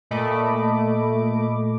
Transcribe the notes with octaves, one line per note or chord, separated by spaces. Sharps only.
A#2 A3 D#5 B5 D6